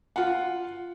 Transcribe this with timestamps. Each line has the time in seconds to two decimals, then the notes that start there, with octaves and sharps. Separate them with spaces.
0.16 F4 F#5